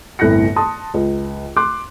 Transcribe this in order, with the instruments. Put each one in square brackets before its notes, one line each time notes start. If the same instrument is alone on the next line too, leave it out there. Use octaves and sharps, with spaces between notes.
[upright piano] G1 C2 A2 F#6 A#6 C#7
A5 C6 D#6
C#2
C6 D6 F#6